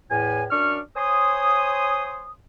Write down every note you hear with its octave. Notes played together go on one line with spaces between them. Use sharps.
E2 A2 G#5
F#2 D4 C#6 D6 F6
C5 C#5 G#5 C6 D#6